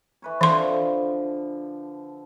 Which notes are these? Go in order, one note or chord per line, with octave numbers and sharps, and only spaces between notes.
E3 B4 C#5
D3 E3 F3 C4 C6